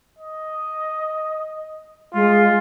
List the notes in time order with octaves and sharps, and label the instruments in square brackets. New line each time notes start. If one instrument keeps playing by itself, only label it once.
[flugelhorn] D#5
[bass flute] G#3 [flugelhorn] F4